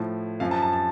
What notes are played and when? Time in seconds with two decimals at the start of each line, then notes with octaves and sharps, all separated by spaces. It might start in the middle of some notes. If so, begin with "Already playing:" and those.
Already playing: A2 F3
0.40 F#2 F3 F5
0.51 A5
0.62 A5
0.73 A5